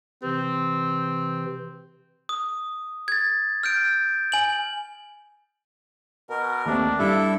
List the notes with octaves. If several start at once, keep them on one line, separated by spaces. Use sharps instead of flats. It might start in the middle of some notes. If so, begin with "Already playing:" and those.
C3 E3 C4
D#6
G#6 A6
F6 G6 D7
G#5 F#7
B2 A#4
D#2 A3 C4 D4
G2 G3 E4 A4 E5